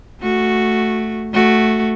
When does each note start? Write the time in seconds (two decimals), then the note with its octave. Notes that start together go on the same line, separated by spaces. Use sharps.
0.21 A3 F#4
1.33 A3 F#4